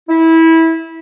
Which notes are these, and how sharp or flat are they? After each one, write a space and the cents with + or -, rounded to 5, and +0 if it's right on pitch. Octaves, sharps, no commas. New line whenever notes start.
E4 -20